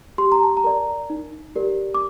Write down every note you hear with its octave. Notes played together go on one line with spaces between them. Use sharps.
G4 C6
A#5
A5
A#5
A#4 D5
D#4
G4 A#4 D5
D6